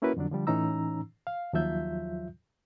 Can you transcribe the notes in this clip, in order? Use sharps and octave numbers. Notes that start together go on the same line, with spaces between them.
A#3 C#4 E4 F#4 A#4 B4
F2 D3 F#3 D4
D3 F3 G3
A2 E3 C#4 D#4 A#5 E6
F5
D#2 F3 F#3 F4 E5 G6